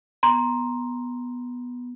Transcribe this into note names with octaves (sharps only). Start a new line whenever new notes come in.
B3 A#5 C6